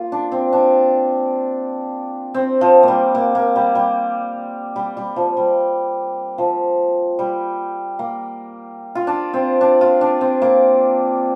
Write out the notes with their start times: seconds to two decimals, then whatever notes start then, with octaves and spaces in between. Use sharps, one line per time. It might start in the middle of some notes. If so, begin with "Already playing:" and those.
Already playing: A#3 F4
0.12 D4
0.32 C4
0.53 D4
2.34 C4
2.61 F3
2.83 G3 A#3
3.15 A#3
3.35 A#3
3.56 G3
3.75 G3
4.76 G3
4.97 G3
5.16 F3
5.37 G3
6.38 F3
7.19 G3
7.99 A#3
8.95 F4
9.07 D4
9.34 C4
9.61 D4
9.81 F4
10.01 D4
10.21 C4
10.42 A#3